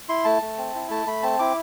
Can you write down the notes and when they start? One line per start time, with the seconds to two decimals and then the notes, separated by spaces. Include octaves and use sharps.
0.09 E4 C6
0.25 A3 A5
0.42 A3
0.58 C4
0.75 E4
0.90 A3 A5
1.06 A3 B5
1.23 C4 A5
1.39 E4 D6